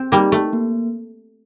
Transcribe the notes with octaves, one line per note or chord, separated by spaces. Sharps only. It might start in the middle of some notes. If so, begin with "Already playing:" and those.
Already playing: C4
G3 A#3 D#4 G4
A3
A#3